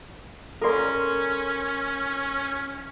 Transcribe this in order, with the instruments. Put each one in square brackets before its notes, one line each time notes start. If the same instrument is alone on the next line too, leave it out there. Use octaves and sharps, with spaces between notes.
[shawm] C#4 [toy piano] A4 D5 [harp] A#4 C6